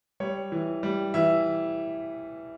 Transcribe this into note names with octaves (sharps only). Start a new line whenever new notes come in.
G3 C#5
E3
G3
E3 E5